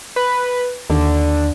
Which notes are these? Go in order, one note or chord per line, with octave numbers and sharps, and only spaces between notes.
B4
D#2 D3